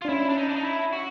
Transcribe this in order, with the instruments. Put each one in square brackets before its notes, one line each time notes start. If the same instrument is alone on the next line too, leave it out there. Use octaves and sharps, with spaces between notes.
[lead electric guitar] F4
[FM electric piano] D4
[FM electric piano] C#4 [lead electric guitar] E4
[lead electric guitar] D4
D#4
D4
D#4
E4
F#4